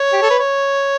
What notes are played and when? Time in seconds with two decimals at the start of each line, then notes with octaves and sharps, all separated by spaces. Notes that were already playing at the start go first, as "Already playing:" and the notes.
Already playing: C#5
0.13 G4
0.22 A4
0.30 B4
0.39 C#5